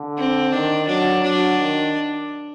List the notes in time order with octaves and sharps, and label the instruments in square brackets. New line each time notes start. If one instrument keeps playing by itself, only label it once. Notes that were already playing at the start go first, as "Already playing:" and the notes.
Already playing: [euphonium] D3
[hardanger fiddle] C4
[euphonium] D#3 [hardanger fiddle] D4
[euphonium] F#3 [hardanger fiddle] D4
[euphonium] F#3 [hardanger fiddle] D4
[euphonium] D#3